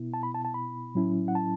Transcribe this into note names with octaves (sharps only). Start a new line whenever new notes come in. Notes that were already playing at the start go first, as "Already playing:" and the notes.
Already playing: B2 B3 E4
A5
B5
A5
A5
B5
A2 F#3 C#4 E4
F#5
A5